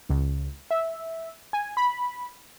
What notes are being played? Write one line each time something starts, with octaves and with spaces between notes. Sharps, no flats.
C#2
E5
G#5
B5